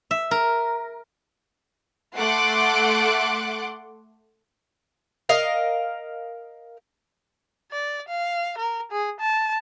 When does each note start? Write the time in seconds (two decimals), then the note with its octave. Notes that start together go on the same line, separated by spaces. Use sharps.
0.11 E5
0.31 A#4
2.17 A3 F#5 C6 D6 F#6
5.29 A#4 D#5 F5
7.71 D5
8.08 F5
8.58 A#4
8.92 G#4
9.20 A5